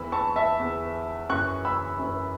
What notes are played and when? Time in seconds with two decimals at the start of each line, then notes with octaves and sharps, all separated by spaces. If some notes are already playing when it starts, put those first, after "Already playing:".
Already playing: E2 E3 B5 E6
0.12 A5 C#6
0.36 E5 A5
0.60 E2 E3
1.29 F#2 E3 C#6 F#6
1.65 B5 E6
1.99 F#2 E3